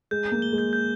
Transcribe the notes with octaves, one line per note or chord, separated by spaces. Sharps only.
G#3 G6
G6
A#3
G7
G#3
G6
G6